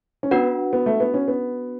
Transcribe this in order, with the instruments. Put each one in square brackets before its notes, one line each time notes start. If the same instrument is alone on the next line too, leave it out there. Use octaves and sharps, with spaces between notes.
[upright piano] C#4
[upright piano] B3 [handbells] D4 F#4 B4 F#5
[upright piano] B3
A3
B3
C#4
B3